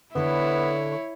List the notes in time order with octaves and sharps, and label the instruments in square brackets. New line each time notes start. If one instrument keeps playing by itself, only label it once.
[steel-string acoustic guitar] D3 A4 D5 [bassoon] B3 [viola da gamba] E4 C#5